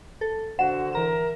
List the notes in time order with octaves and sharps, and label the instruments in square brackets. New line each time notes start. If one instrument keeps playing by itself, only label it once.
[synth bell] A4
[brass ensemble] D3 C5 [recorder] F#4 [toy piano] F#5 [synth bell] E7
[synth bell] E3 A#5 E7 [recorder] A#4